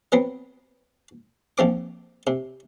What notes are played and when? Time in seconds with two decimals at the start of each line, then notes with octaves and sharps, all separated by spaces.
0.12 F#3 B3 C4
1.58 A#1 F3 C4 D6
2.27 C3